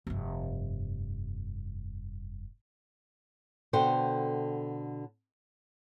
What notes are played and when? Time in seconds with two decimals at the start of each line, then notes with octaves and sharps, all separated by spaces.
0.07 F1 G2
3.73 B2 D3 A4 C5 G5